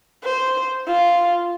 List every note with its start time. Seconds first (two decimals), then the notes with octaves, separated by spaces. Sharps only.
0.24 C5
0.87 F4